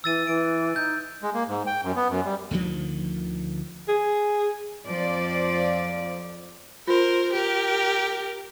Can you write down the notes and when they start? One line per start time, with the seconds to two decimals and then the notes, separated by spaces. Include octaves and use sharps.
0.04 E3 E6 A6 D#7
0.27 E3 D7
0.76 D#4 G6
1.23 G#3
1.34 A#3
1.48 G#2
1.67 G5
1.83 F#2
1.96 B3
2.09 F#2
2.25 G3
2.51 D2 D3 D#3 F3
3.88 G#4
4.87 F2 F3 D5
6.87 F4 A#4 C5
7.33 G4 A#4